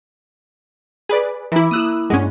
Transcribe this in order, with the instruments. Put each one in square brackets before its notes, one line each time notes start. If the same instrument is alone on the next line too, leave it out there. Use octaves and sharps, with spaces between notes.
[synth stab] G#4 B4 D5
[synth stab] E3 E4 [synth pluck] A#5 B5 D6
[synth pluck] A#3 E4 [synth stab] D#6 E6 F#6
[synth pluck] G2 D4 F#5 [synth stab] G#3 C#4